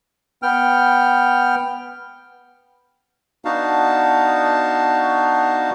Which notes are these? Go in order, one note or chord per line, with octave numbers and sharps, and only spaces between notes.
B3 G5 F6
B3 D4 D#4 F#4 F5 A5